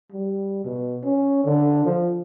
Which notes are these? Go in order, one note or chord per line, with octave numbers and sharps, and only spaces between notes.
G3
B2
C#4
D3
F3